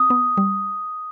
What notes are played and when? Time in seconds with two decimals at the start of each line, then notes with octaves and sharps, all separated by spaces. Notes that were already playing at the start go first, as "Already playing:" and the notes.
Already playing: C4 D#6
0.10 B3
0.37 G3